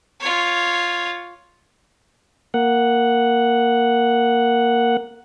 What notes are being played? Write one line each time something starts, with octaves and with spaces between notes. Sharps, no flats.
F4 C#5
A#3 F#5